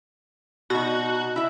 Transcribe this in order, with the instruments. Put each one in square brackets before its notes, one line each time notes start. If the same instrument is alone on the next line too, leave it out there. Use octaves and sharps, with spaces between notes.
[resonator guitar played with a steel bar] B2 D#4 [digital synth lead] F#4
[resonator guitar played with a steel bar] E4 E5